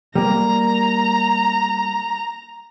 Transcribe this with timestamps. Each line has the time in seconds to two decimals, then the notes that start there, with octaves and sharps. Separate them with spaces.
0.15 G3 A#3 A#5